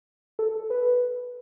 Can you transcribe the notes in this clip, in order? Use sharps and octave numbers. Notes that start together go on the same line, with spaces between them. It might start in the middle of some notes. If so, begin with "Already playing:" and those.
A4
B4